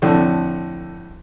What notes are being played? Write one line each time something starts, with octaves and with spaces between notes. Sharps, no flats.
F2 A2 D3